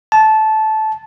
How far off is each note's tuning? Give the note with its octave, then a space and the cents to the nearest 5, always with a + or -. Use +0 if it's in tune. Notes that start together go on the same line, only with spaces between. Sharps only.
A5 -15